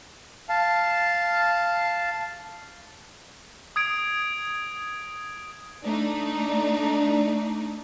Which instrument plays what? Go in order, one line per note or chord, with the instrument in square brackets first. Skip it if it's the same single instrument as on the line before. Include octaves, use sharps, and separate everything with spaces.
[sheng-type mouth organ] F5 A5
[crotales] D#6 G#6 D7
[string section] A3 D4 D#4